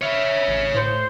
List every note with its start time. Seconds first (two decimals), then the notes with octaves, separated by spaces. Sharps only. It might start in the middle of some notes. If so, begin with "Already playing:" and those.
0.02 C#5 E5 F5
0.48 A1
0.75 A2 C5